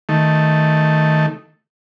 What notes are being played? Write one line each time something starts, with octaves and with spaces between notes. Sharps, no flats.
D#3 A3